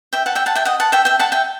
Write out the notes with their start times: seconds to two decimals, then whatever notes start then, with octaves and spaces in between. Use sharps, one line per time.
0.13 E5 G5
0.26 F#5 A5
0.35 E5 G5
0.46 F#5 A5
0.55 E5 G5
0.65 D#5 F#5
0.80 F#5 A5
0.92 E5 G5
1.05 E5 G5
1.19 F#5 A5
1.32 E5 G5